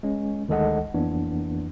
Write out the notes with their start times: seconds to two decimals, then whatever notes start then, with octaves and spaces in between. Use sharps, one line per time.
0.03 G#3 C#4
0.48 D2 D#3 G#3 A4 D#5 F#5
0.94 F2 E3 A#3 B3 D4